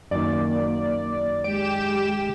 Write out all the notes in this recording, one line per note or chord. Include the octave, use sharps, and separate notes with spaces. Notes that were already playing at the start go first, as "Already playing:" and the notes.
F#2 D#3 A#3 D5
G#3 G4 D7 E7